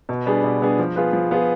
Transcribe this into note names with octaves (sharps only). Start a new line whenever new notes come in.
B2
G3 B3 D4 G#4
B2
G3 B3 D4 G#4
F3
B3 F4 G#4 B4
F3
B3 F4 G#4 B4